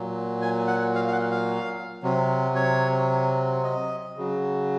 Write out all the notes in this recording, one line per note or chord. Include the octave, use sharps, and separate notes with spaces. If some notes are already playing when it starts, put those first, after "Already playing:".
Already playing: A#2 F#3
G#5
F#5
F5
F5
F#5
F5
C3 F#3
C#5
D#5
C#3 F#3